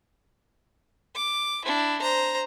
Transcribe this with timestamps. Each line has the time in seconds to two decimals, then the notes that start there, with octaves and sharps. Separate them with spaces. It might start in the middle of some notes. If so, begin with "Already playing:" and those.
1.16 D6
1.65 D4 E4
2.02 C5 A#5